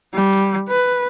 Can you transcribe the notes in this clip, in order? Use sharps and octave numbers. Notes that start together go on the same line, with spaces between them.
G3
B4